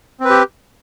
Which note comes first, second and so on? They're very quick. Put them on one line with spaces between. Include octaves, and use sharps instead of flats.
C4 B4 G4